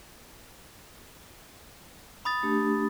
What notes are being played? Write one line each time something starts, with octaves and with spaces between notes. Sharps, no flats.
B5 D#6 A6
A3 D4 G4